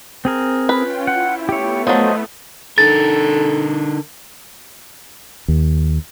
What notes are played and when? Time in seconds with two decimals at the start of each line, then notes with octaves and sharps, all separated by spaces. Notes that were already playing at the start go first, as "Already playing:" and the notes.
0.25 C4 G#4 A#4
0.69 C#4 F4 B4 G5
1.07 E4 F#5
1.49 A3 B3 G4 C#5
1.87 F3 F#3 C5 D#5 A5
2.78 D3 D#4 A4 A#4 A6
5.48 D#2